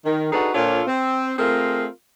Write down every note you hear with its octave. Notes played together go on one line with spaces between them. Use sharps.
D#3
D4 D#4 F#4 G#4 A4 B4
A#2 D4 F4 A4 C5 C#5
C4
A3 C4 F4 G#4 A#4